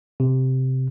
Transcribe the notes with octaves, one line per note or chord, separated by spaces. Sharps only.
C3